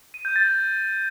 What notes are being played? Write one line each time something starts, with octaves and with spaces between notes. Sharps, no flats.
D#7
G6
A6